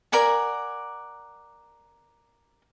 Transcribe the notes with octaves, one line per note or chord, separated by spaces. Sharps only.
A#4 D5 F#5 G#5